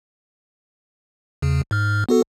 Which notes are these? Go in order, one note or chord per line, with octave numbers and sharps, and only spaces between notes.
E2 C#3
G#2 F6
B3 F#4 A4